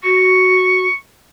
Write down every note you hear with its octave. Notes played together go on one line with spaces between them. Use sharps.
F#4 C#6